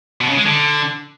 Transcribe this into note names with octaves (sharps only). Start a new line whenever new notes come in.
B2
C#3
G#3
D3